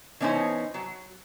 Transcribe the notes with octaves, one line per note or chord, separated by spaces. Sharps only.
E3 B3 C#4 D#4 C5
F#3